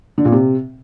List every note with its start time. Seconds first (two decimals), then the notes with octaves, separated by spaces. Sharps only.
0.18 D3
0.25 A#2
0.32 C3